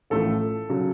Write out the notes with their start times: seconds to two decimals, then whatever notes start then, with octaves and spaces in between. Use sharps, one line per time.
0.10 A1 A2 F3 A3 A4
0.69 C#3 F#3